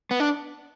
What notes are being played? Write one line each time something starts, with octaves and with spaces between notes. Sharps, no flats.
B3
D4